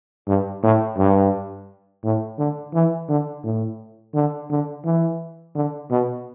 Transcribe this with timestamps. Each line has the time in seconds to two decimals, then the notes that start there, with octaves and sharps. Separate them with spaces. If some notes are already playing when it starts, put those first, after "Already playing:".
0.27 G2
0.63 A2
0.98 G2
2.04 A2
2.38 D3
2.74 E3
3.09 D3
3.44 A2
4.14 D3
4.50 D3
4.85 E3
5.55 D3
5.91 B2